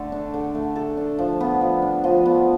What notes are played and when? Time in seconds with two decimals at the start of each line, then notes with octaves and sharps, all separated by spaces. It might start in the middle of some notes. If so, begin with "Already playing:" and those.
Already playing: D3 A3 A4
0.12 D4
0.34 D3
0.55 A3
0.76 A4
0.97 D4
1.19 F3
1.40 B3
1.61 F3
1.82 D4
2.04 F3
2.26 B3